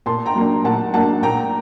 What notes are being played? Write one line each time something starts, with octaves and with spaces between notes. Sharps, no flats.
A#2 A5 C6
G5 A#5
F#3 A#3 D4
A#2 F#5 A5
F#3 A#3 D4 F#5 A5
A#2 G5 A#5